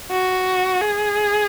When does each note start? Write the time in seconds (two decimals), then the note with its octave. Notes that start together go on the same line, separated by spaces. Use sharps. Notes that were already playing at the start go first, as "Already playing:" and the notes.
0.11 F#4
0.82 G#4